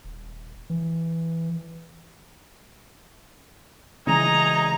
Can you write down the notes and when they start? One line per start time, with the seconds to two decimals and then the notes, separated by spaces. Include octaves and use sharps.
0.04 D#1
0.70 E3
4.07 C#3 E3 G#3 D#4 G#5 A#5